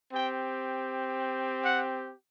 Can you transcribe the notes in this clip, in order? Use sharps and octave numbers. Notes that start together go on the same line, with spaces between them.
C4 G4 G5
F#5